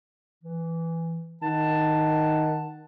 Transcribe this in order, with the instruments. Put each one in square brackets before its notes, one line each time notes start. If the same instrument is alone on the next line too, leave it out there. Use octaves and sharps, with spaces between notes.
[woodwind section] E3
[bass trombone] D#3 [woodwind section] F#5 A5